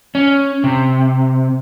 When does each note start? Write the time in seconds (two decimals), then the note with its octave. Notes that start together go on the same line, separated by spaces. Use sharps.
0.15 C#4
0.64 C3